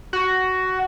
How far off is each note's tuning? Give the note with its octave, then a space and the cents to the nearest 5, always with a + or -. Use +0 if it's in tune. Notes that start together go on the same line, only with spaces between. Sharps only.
F#4 +10